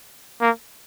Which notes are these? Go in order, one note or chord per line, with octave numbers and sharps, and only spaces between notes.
A#3